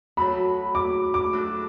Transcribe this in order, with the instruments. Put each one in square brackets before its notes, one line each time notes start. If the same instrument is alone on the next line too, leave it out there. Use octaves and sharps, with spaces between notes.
[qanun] F#3 A3 F#4 [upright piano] B5
[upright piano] D6
D6
[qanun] A3 D4 F#4